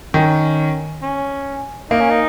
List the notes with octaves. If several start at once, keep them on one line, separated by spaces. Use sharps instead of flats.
D#3 C#4
C#4
A#3 D#4
C#4
D#4